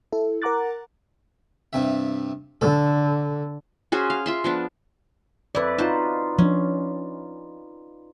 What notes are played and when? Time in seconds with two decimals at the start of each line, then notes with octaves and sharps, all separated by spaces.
0.12 E4 A4
0.42 A#4 F#5 A#5 D6 F#6 A6
1.73 G2 C3 E5
2.61 D3 A4
3.92 C#4 F#4 G#4 C5
4.10 F5
4.26 F4 E5 C6
4.44 F3 B3 D4
5.55 F2 E4 B4 D5
5.78 D#4 F4 F#4 C5 A5
6.38 F3 C#4 D4